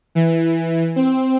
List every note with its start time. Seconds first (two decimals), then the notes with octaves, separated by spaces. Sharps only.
0.15 E3
0.96 C4